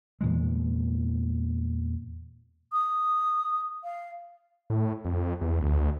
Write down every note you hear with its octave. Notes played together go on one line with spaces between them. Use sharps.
E2 A#2 E3 G#3
D#6
F5
A2
F2
E2
D2